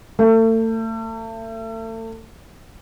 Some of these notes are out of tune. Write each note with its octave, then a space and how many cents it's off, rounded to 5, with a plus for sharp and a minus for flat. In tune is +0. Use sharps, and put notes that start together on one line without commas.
A3 +35